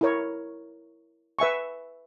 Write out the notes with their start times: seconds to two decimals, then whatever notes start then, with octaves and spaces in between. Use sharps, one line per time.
0.01 E4 A#4 C#5
1.39 B4 E5 G#5 C#6